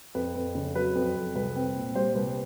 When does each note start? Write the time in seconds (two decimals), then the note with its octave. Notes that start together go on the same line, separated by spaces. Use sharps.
0.15 F2 B4
0.35 F2
0.55 C#3
0.75 F#3 B4
0.95 F2
1.15 F2
1.35 C2 B4
1.56 C4
1.76 A#2
1.95 G3 C5
2.15 C2 B4